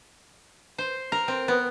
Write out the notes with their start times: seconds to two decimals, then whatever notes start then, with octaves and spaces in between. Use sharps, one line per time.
0.78 C5
1.12 A#4
1.28 C4
1.48 B3